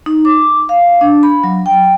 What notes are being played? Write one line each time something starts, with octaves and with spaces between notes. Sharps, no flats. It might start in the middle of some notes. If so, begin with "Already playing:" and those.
D#4
D6
F5
D4
B5
F#3
G5